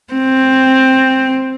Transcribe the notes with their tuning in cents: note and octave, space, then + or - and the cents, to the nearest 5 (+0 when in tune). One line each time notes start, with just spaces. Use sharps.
C4 +5